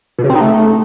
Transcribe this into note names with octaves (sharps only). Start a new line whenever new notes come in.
B2
C#3
C4
D#4
A3